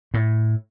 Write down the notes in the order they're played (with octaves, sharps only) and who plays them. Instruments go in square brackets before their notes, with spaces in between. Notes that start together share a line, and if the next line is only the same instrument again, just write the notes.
[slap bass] A2